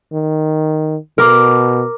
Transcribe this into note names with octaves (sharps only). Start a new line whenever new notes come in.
D#3
B2 A#4 D6